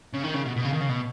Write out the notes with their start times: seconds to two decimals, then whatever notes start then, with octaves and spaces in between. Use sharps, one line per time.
0.14 C#3
0.24 D#3
0.34 C#3
0.46 B2
0.56 B2
0.65 C#3
0.73 D#3
0.81 C#3
0.89 B2